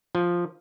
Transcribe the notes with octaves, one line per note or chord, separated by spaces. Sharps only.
F3